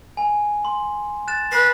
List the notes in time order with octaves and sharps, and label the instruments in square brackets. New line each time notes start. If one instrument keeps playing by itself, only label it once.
[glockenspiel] G#5
C6
F#6 A6 E7
[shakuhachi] B4 [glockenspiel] A#6 C7